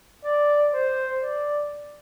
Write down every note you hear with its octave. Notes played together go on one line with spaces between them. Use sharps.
D5
C5
D5